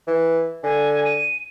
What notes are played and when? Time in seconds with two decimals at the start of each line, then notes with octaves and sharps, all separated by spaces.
0.07 E3
0.63 D3 G#5
1.05 D#7